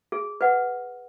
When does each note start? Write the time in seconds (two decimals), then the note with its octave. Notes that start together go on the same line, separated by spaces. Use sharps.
0.12 G#4
0.41 B4 F#5